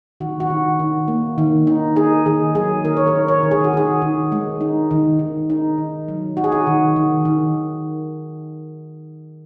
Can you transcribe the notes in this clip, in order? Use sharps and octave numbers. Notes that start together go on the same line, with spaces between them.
D#3 F#4
F#4
D#3
D#3
A#3
D#3
D#4
D#4 G#4
D#3 G#4
F#3 G#4
D#3 A#4
C#5
A#4
D#3
C#5
D#3
G#4
F#4
D#3 G#4
D#3
G#3
D#4
D#3
D#3
D#4
D#3
F#3
D#4 F#4
G#4
F#4
D#3
D#3
D#3